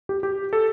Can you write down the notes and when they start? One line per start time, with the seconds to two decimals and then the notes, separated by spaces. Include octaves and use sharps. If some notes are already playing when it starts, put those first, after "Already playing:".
0.09 G4
0.23 G4
0.53 A4